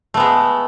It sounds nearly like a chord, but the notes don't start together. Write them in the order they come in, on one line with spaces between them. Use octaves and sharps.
A3 B3 G#3